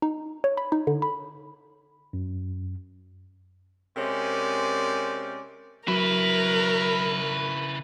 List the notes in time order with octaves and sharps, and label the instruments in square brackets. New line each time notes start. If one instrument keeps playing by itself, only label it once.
[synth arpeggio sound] D#4
C#5
B5
D#4
D3
B5
[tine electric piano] F#2
[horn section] C3 G#3 C#4 A#4 C5 D5
[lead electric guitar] C#3 E4 [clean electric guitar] F#3 [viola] A#4 [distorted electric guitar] B4